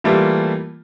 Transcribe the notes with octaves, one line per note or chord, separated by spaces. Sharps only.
E3 G3 A3 A#3 F4